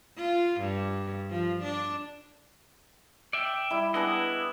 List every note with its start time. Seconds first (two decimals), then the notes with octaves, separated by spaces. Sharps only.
0.17 F4
0.61 G2
1.30 F3
1.63 D4
3.33 D5 E5 G5
3.70 G3 E4
3.94 B3 D4 E4 G#4 D#5